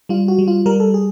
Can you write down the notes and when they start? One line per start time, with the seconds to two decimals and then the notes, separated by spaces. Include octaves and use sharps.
0.09 G3 F4
0.28 F#4
0.39 G3
0.48 F4
0.66 G3 A#4
0.80 A4
0.94 G#4